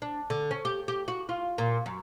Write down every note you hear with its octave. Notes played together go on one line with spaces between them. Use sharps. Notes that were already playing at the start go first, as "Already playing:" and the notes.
D4
D3
C#4
G4
G4
F#4
F4
A#2
F#2